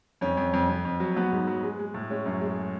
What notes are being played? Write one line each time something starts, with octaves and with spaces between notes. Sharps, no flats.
F2 C#4
F2
F2
F2
F2
F#3
F#3 B3
G#2
F#3
G#3
G#3
A2
G#3 C#4
F#2
G#3